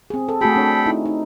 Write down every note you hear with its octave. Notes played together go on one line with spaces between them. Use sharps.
C4 G#4
A4
A3 F#4 G#4 A4 G5 B5
C4 D4 C#5
D#4 E4
D#4